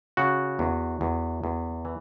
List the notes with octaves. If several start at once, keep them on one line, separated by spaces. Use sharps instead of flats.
C#3 F#4
E2
E2
E2
E3